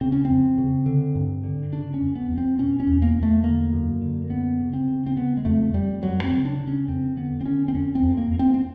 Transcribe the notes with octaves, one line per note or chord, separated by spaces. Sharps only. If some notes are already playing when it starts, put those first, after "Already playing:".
C#3 C4
C#4
F2 C4
C#3
D3
G2
D3
C#3 D4
C#4
F2
B3
F2
C4
B2 C#4
C#4
E2
A#3
E2
A3
D3 A#3
F#2
D3
F#2 B3
C#3
C4
C#3
C4
C#3 B3
G#3
F2 A3
F2 G3
F#2 F#3
C4
C#3
D4
C#3
C#4
F2 C4
D3 B3
C4
D3 C#4
C4
F2 C#4
C4
F2
A#3
F2
C4
C4